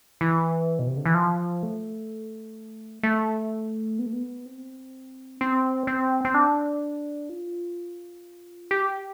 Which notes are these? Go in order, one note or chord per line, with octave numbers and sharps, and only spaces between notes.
E3
B2
C3
D3
E3
F3
A3
A3
B3
A3
B3
C4
C4
C4
C4
D4
F4
G4